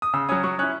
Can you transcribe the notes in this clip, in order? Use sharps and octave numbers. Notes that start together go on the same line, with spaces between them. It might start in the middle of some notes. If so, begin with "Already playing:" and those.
D#6
C#3 E6
F#3 C#4 D#6
F#3 C#6
C#4 E4 F#6